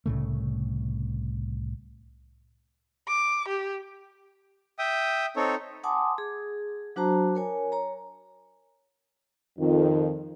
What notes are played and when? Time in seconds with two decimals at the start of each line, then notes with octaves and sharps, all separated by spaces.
0.06 C2 A2 C#3 A3
3.08 D6
3.48 G4
4.78 E5 G5 D#6
5.36 C4 D#4 A4 C#5
5.84 F#5 G#5 A5 C6 D6 D#6
6.18 G#4
6.96 F#3 D4 F#4 C5 A5 A#5
7.35 A#4 C#5 G#5
7.72 C#5 A#5
9.59 F2 D#3